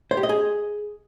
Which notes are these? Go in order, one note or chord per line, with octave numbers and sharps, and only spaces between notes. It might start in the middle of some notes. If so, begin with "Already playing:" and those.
C5
G4
D#5
G#4